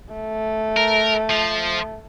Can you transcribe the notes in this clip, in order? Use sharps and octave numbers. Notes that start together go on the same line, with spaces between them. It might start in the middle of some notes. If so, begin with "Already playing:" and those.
A3
A#4
F3